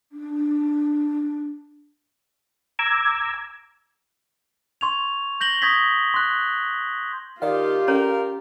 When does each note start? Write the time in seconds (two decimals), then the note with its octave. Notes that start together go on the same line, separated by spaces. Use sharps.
0.12 D4
2.79 A#5 D6 E6 G#6
4.81 C6 C#6 G#6 F7
5.41 G6 A#6 F#7 G7
5.62 C#6 D#6 G6 G#6 A#6 B6
6.14 C6 F#6
7.42 D#3 F4 G4 D5 F5
7.88 C#4 A4 A#4 C#5